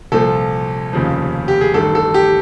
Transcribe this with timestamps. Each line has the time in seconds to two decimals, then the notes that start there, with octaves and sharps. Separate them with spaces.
0.12 C2 A#2 F3 A4
0.93 F1 D#2 C#3 F3
1.48 G4
1.61 G#4
1.74 A1 G2 D#3 A4
1.95 A4
2.14 G4